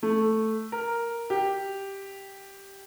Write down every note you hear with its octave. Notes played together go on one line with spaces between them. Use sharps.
A3
A#4
G4